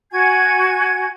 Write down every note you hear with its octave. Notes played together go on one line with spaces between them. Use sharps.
F#4 G#5 G#6